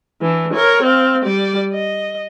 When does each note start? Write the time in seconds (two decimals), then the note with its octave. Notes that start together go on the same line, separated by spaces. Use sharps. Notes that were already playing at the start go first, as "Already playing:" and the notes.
0.22 E3 D4
0.53 A#4 C#5
0.83 C4 F5
1.24 G3 D5
1.73 D#5